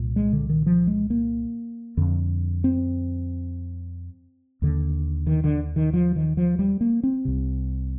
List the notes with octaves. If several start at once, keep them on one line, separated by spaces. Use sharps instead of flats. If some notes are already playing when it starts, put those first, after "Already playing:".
Already playing: C2 A#2
G#3
D3
D#3
F3
G#3
A#3
F2 D3
C4
D#2 D3
D#3
D3
D#3
F3
D#3
F3
G3
A#3
C4
C2 C3